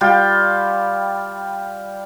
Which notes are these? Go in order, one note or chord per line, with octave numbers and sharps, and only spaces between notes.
G3 F4 G5